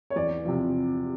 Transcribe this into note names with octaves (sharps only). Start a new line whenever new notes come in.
C#5
E2 D5
C3 F3